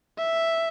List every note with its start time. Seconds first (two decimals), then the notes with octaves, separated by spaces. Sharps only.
0.18 E5